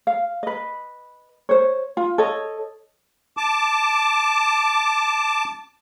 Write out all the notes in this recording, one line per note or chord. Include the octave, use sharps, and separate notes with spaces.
F5
B4 D#5
C5 C#5
F4
A4 C#5 D#5
A5 D6